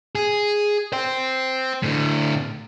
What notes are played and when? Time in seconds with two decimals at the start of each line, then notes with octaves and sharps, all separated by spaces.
0.15 G#4
0.92 C5 G5
1.83 A2 D3